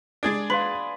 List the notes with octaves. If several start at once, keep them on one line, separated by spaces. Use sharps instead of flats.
G#3 D4 G#4 D5 G#6 D7
B4 F5 C6 F#7